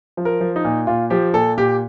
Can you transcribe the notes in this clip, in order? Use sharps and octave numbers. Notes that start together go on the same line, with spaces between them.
F3
A#4
F3
D#4
A#2
A#2 F4
F3 G4
A#2 A4
A#2 G4